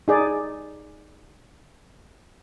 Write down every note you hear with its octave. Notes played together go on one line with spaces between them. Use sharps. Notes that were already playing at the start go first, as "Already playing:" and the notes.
D#4 G#4 D5